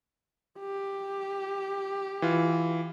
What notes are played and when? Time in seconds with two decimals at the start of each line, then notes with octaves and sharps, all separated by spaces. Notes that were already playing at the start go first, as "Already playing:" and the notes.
0.60 G4
2.22 E3 F4